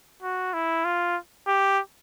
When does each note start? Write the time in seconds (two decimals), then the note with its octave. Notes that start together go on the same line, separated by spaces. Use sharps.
0.23 F#4
0.54 E4
0.85 F4
1.48 G4